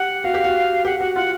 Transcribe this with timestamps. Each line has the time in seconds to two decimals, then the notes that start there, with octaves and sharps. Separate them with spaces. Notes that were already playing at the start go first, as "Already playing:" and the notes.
Already playing: G4 F#5
0.24 F#4 F5
0.34 G4
0.44 F#4
0.85 G4 F#5
1.00 F#4 F#5
1.15 F4 F#5